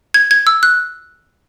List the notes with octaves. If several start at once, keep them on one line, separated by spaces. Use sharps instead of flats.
G#6
G#6
E6
F#6